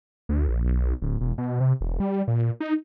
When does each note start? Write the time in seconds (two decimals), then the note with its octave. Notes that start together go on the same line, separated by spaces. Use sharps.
0.29 D2
0.49 A#1
0.64 B1
1.02 D1
1.21 E1
1.38 B2
1.60 C3
1.81 E1
2.00 G3
2.28 A#2
2.60 D#4